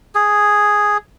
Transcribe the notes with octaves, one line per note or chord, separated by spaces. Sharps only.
G#4